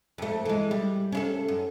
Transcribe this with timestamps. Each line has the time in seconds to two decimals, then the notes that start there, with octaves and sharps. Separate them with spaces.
0.18 F2 A3
0.45 E3 G#3
0.71 G3
1.12 C#4 E4 A4
1.48 F#2